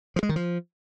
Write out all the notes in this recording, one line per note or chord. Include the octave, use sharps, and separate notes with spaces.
F3
G#3
D#3
F3